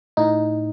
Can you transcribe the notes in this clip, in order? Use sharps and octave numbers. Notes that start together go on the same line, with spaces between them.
A2 D#4